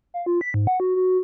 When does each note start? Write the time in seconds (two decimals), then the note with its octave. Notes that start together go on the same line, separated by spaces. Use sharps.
0.14 F5
0.26 F4
0.41 B6
0.54 G#2
0.67 F#5
0.80 F#4
0.96 F#4